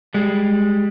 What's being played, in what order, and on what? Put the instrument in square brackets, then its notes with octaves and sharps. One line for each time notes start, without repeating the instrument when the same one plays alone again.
[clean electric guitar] G3 G#3